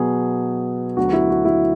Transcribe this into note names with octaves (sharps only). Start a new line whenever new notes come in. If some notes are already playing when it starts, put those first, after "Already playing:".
Already playing: B2 F#3 B3 G#4
D2 D3 F#3 B3 F#4
E4
F#4
E4